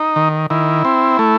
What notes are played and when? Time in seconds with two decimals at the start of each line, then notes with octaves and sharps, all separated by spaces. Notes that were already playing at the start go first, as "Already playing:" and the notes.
Already playing: D#4
0.16 D#3
0.50 D#3 E4
0.85 C4
1.19 A3